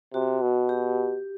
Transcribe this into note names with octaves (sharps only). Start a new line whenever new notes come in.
C3 F#4
B2
G4